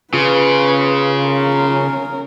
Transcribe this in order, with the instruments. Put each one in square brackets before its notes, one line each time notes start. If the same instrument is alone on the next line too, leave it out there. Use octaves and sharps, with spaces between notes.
[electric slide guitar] C#3 [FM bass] F4 [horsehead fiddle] B4
[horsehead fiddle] C#4 A#4